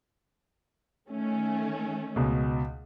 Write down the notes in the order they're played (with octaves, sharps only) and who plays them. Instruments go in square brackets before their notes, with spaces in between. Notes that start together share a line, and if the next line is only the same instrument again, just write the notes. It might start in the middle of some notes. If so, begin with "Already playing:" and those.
[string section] D#3 A3 C#4
[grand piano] C#2 B2